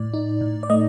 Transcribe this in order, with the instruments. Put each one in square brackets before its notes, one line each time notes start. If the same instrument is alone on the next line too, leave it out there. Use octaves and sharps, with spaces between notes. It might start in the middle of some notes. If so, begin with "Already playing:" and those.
Already playing: [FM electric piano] A2 D5
D#4
A2
D5
A3 D#5